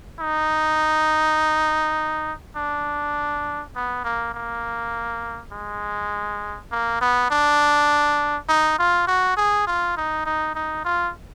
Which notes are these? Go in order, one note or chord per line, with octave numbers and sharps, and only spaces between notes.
D#4
D4
B3
A#3
A#3
G#3
A#3
B3
D4
D#4
F4
F#4
G#4
F4
D#4
D#4
D#4
F4